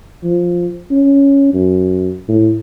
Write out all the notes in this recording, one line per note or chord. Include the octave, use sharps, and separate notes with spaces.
F3
C#4
F#2
A2